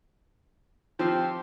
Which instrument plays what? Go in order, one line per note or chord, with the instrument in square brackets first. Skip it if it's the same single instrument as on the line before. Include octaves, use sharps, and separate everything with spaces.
[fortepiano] F3 [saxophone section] C4 G4